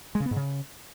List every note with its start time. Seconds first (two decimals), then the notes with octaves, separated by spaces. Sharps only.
0.15 G#3
0.20 C#3
0.26 B3
0.31 G#2
0.36 C#3